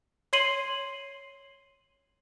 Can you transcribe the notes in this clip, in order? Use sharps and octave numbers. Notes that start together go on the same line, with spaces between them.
C#5 C6 C7 D#7 F#7